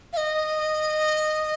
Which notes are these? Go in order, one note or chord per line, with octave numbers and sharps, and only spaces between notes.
F5
D#5